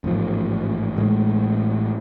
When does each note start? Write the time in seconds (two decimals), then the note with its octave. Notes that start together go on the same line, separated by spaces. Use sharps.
0.04 A1 G#2 F3
0.97 A1 A2 G#3